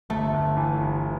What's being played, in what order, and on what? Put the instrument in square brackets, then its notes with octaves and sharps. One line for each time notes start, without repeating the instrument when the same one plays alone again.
[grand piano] G1 [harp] A3
[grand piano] G1
E3
G1